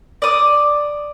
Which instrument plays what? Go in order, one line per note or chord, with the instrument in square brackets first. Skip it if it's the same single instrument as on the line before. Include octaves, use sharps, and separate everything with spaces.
[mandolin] D5 D#6